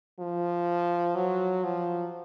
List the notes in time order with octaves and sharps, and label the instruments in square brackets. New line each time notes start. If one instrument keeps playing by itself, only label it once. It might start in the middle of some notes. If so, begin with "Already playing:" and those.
[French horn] F3
F#3
F3